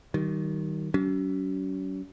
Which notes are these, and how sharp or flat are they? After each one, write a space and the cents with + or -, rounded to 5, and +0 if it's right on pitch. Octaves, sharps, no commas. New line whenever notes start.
D#3 +0 G3 -40
F#3 +40 C#4 +40